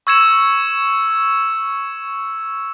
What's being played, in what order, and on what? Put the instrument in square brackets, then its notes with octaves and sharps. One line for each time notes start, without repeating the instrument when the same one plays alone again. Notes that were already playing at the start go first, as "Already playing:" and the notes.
[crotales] C#6 E6 G#6 C#7 E7